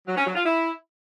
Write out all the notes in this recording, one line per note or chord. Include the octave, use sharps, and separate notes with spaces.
F#3
C#4
F#3
F4
E4